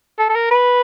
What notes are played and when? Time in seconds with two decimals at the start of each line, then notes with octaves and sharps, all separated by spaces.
0.19 A4
0.29 A4
0.35 A#4
0.51 B4